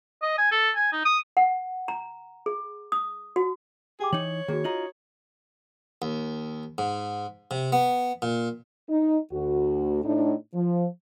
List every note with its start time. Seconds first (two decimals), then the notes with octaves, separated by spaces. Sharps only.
0.23 D#5
0.38 G#5
0.52 A4
0.76 G#5
0.93 D#4
1.05 D#6
1.37 F#5
1.88 A#5
2.46 G#4
2.92 D#6
3.36 F#4
4.00 G4 G#4 G5 D6
4.13 E3 D#4 C#5 F#7
4.48 D#3 A#3 F#4 G#4
4.64 D#4 F4 F#4 D#5 A#5 F#7
6.02 D#2
6.78 G#2
7.51 C3
7.72 B3
8.22 A#2
8.89 D#4
9.31 D2 F#4
10.04 A2 D4 D#4
10.54 F3